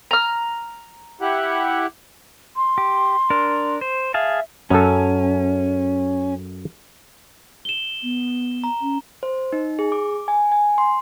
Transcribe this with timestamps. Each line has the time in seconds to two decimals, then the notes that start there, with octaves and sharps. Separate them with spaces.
0.11 A#5 F6
1.21 E4 G4 F#5
2.57 C6
2.78 G4
3.30 D4 A#4
3.81 C5
4.14 G#4 E5 F5 A5
4.70 F#2 C#4 A4
7.65 E7 G7
8.03 B3
8.64 A#5
8.81 C#4
9.23 C5
9.52 D#4
9.79 G#4
9.92 D6
10.28 G#5
10.52 G#5
10.78 C6